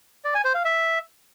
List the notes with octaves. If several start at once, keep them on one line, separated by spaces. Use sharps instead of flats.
D5
G#5
C5
F5
E5